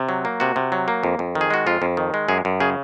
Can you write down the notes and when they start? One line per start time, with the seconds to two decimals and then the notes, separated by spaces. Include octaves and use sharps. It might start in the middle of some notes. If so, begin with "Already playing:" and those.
Already playing: C3
0.09 F#3
0.25 A#3
0.40 C3 F#4
0.56 C3
0.72 F#3
0.88 A#3
1.04 F2
1.19 F2
1.35 D#3
1.41 G#4
1.50 G#3 F#4
1.67 F2 F4
1.82 F2
1.97 D#3
2.14 G#3
2.28 F#2 G#4
2.45 F#2
2.60 C#3 G#4